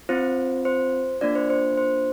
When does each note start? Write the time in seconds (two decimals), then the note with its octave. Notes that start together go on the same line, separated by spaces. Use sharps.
0.09 C4 F4 C5
0.65 C5
1.21 A#3 D4 F4 D5
1.35 C5
1.50 C5
1.78 C5